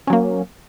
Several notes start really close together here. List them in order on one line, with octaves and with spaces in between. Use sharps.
C#4 F#3 A#3